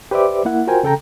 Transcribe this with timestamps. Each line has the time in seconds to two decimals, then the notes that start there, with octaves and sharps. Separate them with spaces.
0.11 G4 B4 C5 D5 E5 D6
0.45 A#3 E4 F#5
0.67 F4 F#4 A#4 C5 G5 G#5
0.83 C#3 A4 G5 A#5